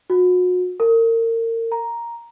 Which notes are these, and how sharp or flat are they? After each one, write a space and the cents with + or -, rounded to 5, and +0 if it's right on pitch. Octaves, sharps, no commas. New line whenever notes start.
F#4 -35
A#4 -35
A#5 +5